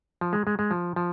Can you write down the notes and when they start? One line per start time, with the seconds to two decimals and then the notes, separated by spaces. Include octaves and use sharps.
0.21 F3
0.33 G#3
0.47 G#3
0.59 G#3
0.71 F3
0.96 F3